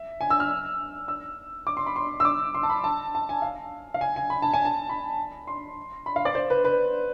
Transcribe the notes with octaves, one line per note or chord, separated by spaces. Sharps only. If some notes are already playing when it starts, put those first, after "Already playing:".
Already playing: E5
G#5
E6
F6
E6
D6
C6
B5
C6
E6
D6
C6
A5
B5
A5
A5
G#5
F5
F5
G#5
G#5
B5
A5
G#5
A5
B5
C6
B5
F5
D5
C5
B4
B4